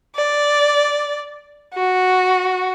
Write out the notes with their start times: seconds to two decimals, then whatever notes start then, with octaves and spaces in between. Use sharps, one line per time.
0.16 D5
1.74 F#4